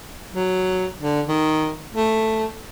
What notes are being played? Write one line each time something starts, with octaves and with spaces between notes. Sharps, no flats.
F#3
D3
D#3
A3